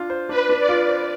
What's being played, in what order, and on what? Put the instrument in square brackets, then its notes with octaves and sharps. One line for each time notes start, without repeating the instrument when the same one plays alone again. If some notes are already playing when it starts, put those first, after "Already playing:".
Already playing: [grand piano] D4 F4
C5
[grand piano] D4 [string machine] B4
[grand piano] D4
[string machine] D5
[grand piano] F4
C5